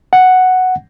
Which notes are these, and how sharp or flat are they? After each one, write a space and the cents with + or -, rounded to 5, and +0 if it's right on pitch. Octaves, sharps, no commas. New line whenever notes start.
F#5 +0